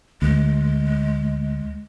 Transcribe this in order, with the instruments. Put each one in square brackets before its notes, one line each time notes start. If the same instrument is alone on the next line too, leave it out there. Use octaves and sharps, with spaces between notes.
[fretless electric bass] D2 [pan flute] G#3